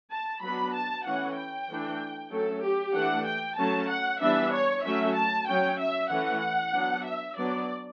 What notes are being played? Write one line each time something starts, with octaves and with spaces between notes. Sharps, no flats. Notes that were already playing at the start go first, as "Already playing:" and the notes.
A5
F#3 B3 D4 B5
A5
E3 A3 C#4 F#5
G5
E3 A3 D4
F#3 A3 C#4 A4
G4
E3 A3 D4 F#5
G5
F#3 A3 C#4 A5
F#5
E3 G3 B3 D4 E5
C#5
F#3 A3 C#4 E5
A5
F#3 C#4 G5
E5
E3 A3 C#4 F#5
F#3 B3 D4
E5
F#3 B3 D4 D5